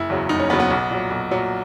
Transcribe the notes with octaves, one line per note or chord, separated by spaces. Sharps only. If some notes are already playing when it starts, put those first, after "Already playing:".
Already playing: F#1 E4
E2 C#3 F#3
F#1 D#4
C#4
E2 C#3 F#3 B3
B3
B1
A#2 F#3
B1
A#2 F#3